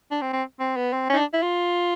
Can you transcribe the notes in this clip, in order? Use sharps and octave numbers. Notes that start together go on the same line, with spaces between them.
D4
C4
C4
C4
B3
C4
C#4
D#4
D4
E4
F4